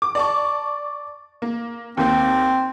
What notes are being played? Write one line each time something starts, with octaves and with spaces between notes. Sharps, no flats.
D6
D5 A5 C#6
A#3
D#2 A#3 C4